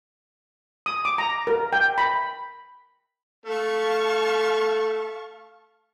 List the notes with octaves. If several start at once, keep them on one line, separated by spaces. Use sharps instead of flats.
D#6
D6
A#5
A#4
G5
B5
A3 F5 A5 C#6